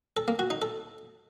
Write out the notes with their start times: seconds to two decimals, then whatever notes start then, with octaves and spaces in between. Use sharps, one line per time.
0.17 A4
0.28 A#3
0.39 F#4
0.50 D#4
0.62 A4